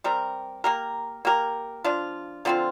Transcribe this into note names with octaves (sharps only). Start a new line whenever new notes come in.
G3 C4 G4 A#4
A#3 G4 A#4
A#3 G4 A#4
F3 D4 F4
D3 F3 C4 F4